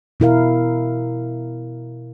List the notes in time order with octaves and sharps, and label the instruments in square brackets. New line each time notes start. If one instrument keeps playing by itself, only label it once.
[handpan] B2 E4 A#4 F5